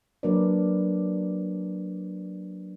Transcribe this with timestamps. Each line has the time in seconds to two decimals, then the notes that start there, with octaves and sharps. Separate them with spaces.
0.23 F#3 A#3 D4 A#4 B4 D5